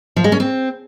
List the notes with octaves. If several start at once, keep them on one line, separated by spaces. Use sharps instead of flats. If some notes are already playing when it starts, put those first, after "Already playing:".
F3
G#3
C#4
C4